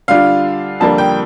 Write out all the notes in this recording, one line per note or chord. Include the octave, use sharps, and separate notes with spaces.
D3 G3 D4 F4 F5
F2 D3 G3 A#3 A5
G5